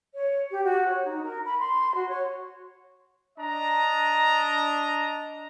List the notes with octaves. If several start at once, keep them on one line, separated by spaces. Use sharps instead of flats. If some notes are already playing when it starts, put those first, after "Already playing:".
C#5
G4
F#4
C#5
D#4
A#4
B5
C6
F#4
C#5
D4 D#5 A#5